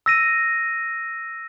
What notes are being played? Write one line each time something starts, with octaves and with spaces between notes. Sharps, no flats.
E6 A#6 D#7